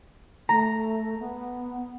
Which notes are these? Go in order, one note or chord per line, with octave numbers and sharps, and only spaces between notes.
A3 A#5
B3